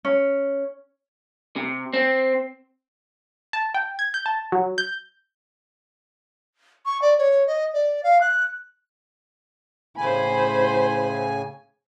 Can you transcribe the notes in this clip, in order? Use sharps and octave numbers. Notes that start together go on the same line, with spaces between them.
C#4
C3
C4
A5
G5
G#6
G6
A5
F#3
G6
C#6
D5
C#5
D#5
D5
F5
F#6
A2 C#3 C5 G#5 B5